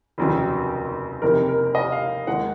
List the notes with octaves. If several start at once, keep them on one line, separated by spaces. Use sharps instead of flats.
F1 D#2 C#3 F#3
F#1 F2 C3 D#3 A#4
A#4
D#5
F5
D#2 D#3 G#3 D#4 F#5